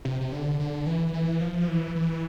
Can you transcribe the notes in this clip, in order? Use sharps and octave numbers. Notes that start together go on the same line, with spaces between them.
C3
C3
D3
D3
E3
E3
F3
E3
E3